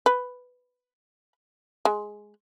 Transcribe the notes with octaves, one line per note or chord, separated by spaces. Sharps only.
B4
G#3